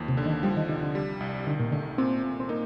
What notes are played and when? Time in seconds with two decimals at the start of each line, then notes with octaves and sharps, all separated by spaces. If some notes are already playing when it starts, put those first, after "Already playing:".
Already playing: D#2 F3
0.08 C3
0.17 D3
0.26 D#3
0.43 F3 G3
0.57 D#3
0.68 C3 D#3
0.82 D3
0.95 G3
1.20 C2
1.46 D3 D#3
1.60 A#2
1.72 D3 A3
1.98 A#2 C4
2.24 A#2
2.40 C4
2.49 A#3 D#4